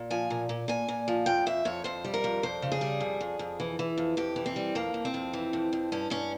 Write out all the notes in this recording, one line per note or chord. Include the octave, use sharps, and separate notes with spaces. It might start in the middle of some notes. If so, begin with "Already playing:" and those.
Already playing: A#2
F3 G#5
A#2
A#2
A#2 G#5
A#2
F3
F2 G5
F2 E5
F2 C#5
F2 C5
G3
A#4
F2
F2 C5
C#3
G#4
G3
F2
F2
F2
E3
E3
F2
F2 G4
E3
C4
G3
F2 A#3
F2
C4
F2
E3
F2
F2
G2 C#4
G2 C#4